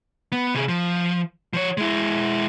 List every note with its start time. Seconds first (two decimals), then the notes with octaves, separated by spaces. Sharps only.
0.32 B3
0.54 C3 G#4
0.68 F3
1.53 F3 C#5
1.77 G#3 E4